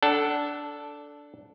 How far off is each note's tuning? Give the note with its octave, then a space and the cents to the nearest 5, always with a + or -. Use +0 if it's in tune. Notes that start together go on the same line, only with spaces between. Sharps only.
D4 -10 A4 +0 F#5 +25